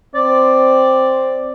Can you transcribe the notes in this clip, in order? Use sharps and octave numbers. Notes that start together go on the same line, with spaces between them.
C4 D5